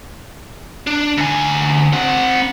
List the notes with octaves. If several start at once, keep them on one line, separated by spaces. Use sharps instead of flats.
D4
D2 G#5
C4 F#5